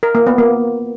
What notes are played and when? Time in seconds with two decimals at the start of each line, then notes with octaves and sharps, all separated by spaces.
0.03 A#4
0.15 A#3
0.27 B3
0.38 A#3